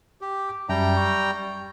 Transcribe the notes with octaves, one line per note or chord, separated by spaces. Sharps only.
G4
D6
F#2 G3 E5 G5 A5 A#5
C#6